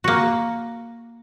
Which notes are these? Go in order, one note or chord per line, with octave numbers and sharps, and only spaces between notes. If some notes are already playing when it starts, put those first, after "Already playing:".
A#3 F#4